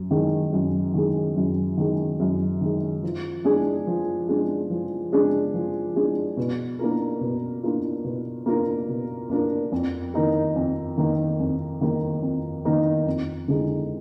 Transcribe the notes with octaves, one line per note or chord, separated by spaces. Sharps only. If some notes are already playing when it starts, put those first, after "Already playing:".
Already playing: F#2
D#3 G#3
F#2
D#3 G#3
F#2
D#3 G#3
F#2
D#3 G#3
F3
G#3 D4 G#4
F3
G#3 D4 G#4
F3
G#3 D4 G#4
F3
G#3 D4 G#4
B2
A#3 D4 F4 A#4
B2
A#3 D4 F4 A#4
B2
A#3 D4 F4 A#4
B2
A#3 D4 F4 A#4
F2
D#3 A#3 D#4 A#4
F2
D#3 A#3 D#4 A#4
F2
D#3 A#3 D#4 A#4
F2
D#3 A#3 D#4 A#4
F2
D3 G#3 D#4